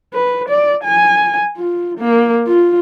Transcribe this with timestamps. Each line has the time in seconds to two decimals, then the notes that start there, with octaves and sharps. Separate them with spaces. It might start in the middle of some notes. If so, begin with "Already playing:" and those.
0.13 B4
0.49 D5
0.84 G#5
1.57 F4
1.98 A#3
2.47 F4